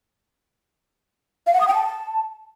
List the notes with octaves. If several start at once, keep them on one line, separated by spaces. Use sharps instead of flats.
F5
F#5
D#6
G5
A5